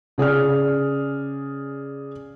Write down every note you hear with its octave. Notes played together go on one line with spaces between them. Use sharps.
C#3 G#4 D5 F6